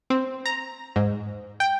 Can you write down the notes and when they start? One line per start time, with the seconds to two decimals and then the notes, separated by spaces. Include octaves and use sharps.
0.10 C4
0.46 A#5
0.96 G#2
1.60 G5